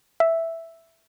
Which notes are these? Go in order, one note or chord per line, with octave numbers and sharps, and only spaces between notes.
E5